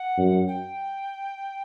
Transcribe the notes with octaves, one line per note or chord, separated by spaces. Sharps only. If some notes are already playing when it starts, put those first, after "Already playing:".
Already playing: F#5
F#2
G5